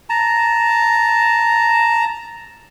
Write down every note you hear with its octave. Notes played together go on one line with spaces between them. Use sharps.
A5 A#5